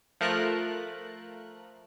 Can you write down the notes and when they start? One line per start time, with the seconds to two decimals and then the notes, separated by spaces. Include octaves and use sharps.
0.21 F3 A3 A#4 F#6